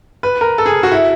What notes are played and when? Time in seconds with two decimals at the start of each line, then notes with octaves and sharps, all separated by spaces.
0.23 B4
0.41 A#4
0.58 A4
0.66 G#4
0.83 F#4
0.92 E4